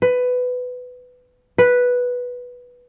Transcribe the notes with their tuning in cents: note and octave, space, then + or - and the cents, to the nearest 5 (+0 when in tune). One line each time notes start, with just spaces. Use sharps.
B4 +15
B4 -5